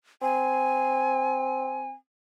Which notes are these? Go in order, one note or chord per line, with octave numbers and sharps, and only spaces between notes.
C4 G#5